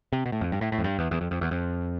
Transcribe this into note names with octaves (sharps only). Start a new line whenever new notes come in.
C3
B2
A2
F2
G2
A2
A2
F2
G2
E2
E2
F2
F2
E2
F2